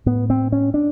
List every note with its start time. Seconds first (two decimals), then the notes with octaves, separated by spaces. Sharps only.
0.06 A2 B3
0.30 C4
0.52 C#4
0.74 D4